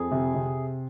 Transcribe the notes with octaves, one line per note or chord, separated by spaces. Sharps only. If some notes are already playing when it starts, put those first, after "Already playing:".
Already playing: F2 G#4
C3
C3